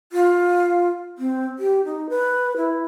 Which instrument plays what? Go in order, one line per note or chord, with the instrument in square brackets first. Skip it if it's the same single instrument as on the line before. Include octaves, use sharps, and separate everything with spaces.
[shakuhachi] F4
C4
G4
D#4
B4
E4